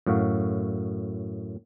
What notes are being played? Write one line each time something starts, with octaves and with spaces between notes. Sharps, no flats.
F#2 A2 F#4 F5